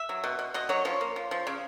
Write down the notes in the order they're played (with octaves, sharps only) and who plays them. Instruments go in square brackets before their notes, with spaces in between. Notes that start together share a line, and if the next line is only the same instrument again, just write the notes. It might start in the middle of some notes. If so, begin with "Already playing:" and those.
Already playing: [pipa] E5
F#3
B2
B2
B2 D#5
F#3 C#5
F3 C#5
A#3
F3
F3
C#3